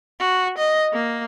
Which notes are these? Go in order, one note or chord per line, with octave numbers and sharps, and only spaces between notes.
F#4
D#5
A#3